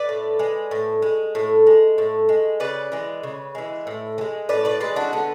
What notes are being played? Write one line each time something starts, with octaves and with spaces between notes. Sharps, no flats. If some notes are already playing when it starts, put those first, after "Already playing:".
Already playing: B4 D5
A2
G#3
A2
G#3
A2
G#3
A2
G#3
C#3 B4 D5
E3 G#3
C#3
E3 G#3
A2
E3
G#3
A2 B4 D5
B4 D5
E3 G#3 B4 D5
D4 F#4
D3 B3